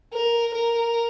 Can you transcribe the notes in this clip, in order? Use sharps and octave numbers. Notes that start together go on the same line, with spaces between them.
A#4
A#4